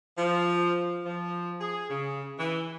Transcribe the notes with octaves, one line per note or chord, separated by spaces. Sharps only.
F3
F3
G#4
C#3
E3